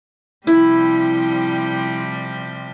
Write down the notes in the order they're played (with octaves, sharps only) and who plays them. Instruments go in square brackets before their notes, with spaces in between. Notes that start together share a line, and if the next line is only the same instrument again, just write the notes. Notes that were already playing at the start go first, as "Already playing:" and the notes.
[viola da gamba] C3 F3 G3 [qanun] E4